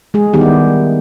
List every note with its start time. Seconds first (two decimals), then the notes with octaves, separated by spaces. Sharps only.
0.14 G#3 G#4
0.33 D#3 G3 B3 D#4 G4
0.41 E4